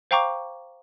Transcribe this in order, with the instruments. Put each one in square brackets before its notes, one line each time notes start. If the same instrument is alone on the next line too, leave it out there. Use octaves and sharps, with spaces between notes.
[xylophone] C5 F5 G5 A#5 C#6 D6